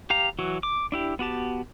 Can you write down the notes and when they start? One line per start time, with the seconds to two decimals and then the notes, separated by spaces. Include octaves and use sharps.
0.10 G4 F5 A#5
0.39 E3 F#3 F#4
0.63 D6
0.92 D4 E4 G4
1.19 B3 F#4 G4 A5